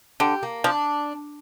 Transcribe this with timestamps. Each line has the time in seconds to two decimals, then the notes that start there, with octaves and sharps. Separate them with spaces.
0.20 D3 G4
0.43 A#3
0.64 F3 D4